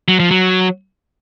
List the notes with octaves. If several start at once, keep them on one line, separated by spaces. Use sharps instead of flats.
F#3
F3
F#3